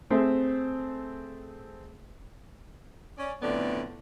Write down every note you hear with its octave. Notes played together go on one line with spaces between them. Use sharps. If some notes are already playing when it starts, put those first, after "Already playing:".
A3 C4 G#4 E5
C#4 D5
F2 A2 D3 B3 D5